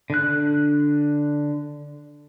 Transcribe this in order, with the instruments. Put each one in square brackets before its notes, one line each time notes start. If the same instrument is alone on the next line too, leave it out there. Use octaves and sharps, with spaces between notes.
[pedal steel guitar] D3 F#6